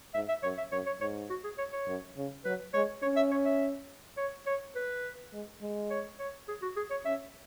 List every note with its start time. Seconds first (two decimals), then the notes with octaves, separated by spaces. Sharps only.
0.15 G#2 E5
0.29 E5
0.43 F#2 C#5
0.58 E5
0.72 F#2 C#5
0.87 C#5
1.01 G#2 C#5
1.30 F#4
1.44 G#4
1.58 C#5
1.73 C#5
1.87 F#2
2.17 C#3
2.45 F#3 B4
2.74 G#3 C#5
3.02 C#4 C#5
3.16 E5
3.31 C#5
3.46 E5
4.17 C#5
4.47 C#5
4.76 B4
5.33 G#3
5.62 G#3
5.90 C#5
6.19 C#5
6.48 G#4
6.62 F#4
6.77 G#4
6.91 C#5
7.05 C#4 E5